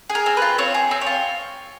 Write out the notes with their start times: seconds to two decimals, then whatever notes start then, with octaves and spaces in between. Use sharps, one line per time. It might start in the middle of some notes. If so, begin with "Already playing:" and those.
0.10 G#4
0.15 A#4
0.26 C4
0.37 F4 B4
0.58 C4 C#5
0.74 G#4
0.91 C4
1.01 C#5
1.07 F4